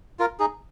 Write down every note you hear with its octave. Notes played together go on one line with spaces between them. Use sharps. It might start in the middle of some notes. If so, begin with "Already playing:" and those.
F4 A#4
D#4 G#4